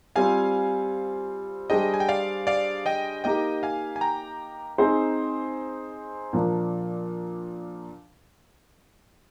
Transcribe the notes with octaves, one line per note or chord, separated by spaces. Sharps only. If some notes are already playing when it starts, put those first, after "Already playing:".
G3 C4 F4 C5 F5 G#5
G3 D4 G#4 C5 D#5 G5
G#5
G5
D5 F5
D5 F5
D#5 G5
A#3 D#4 G4 D#5 G5
F5 G#5
G#5
G5 A#5
C4 D#4 G#4 C5
A#2 F3 A#3 D4